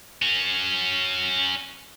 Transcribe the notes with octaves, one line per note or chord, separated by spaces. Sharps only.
C#4 F#4